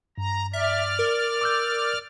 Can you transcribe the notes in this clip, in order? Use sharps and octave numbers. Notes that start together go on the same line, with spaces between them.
G2 A#5
D5 E5 F6
A#4
D6 E6 G6